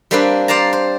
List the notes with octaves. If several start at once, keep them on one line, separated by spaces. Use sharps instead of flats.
G3 A#3 C4 D4 B4
C5 D5 F5 A5 A#5
C5